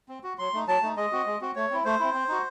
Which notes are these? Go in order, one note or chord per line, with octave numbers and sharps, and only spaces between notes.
C4
F#4
F#3 C6
A3 D#4
F#3 A5
A3 D#4
G#3 D#5
C4 F#4
G#3
C4 F#4
A3 C#5
C4 E4
A3 C5
C4 E4
C4
D#4 F#4